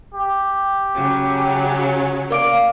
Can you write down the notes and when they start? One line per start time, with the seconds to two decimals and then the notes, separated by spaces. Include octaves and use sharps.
0.14 G4
0.93 C#3 F#3 C#4
2.30 A#3 A#4 D5 F5 D6 D7